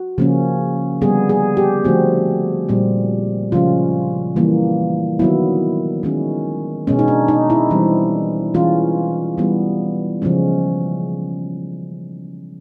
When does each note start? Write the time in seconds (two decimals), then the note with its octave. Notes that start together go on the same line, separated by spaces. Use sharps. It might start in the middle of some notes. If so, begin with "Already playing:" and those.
Already playing: F#4
0.18 C#3 F3 A#3 C#4
1.01 D3 G3 B3 G#4
1.29 G#4
1.57 G4
1.84 D3 F3 A3 C4 F#4
2.69 A#2 G3 C4
3.52 C#3 F3 G#3 C#4 F4
4.36 E3 G3 A#3
5.19 D#3 F#3 B3 E4
6.03 D#3 G#3 C#4
6.87 B2 G#3 B3 C#4
6.99 D#4
7.08 D4
7.28 D#4
7.50 E4
7.70 E3 G3 C4
8.54 E3 G#3 C#4 F4
9.38 E3 G3 B3
10.22 C#3 F3 G#3 C#4